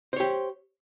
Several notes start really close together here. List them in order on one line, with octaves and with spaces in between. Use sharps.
C5 C#5 G4